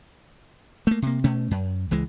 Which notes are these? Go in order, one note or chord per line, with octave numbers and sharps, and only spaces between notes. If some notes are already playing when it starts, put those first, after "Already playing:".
A3 A#3
C3 A#3
B2 A3 C#4
F#2
C#2 E3 G#3